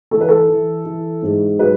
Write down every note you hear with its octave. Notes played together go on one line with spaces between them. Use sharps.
E3 A4
B4
A4
E3
E3
G#2
F#3 B4